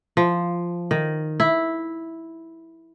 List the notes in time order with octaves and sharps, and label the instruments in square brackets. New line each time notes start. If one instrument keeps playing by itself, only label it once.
[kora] F3
D#3
E4